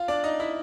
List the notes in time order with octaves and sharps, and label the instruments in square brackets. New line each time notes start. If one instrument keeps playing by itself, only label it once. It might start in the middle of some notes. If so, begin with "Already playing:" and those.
Already playing: [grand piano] F4 F5
D4 D5
D#4 D#5
E4 E5